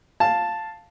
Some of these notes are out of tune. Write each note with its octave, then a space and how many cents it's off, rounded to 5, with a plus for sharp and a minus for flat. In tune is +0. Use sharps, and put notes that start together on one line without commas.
F5 +0 A5 +0